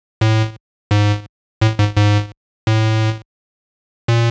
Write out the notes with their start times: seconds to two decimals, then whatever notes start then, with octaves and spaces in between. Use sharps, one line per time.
0.21 A2
0.91 G#2
1.62 A2
1.79 G#2
1.97 G#2
2.67 A2
4.08 A#2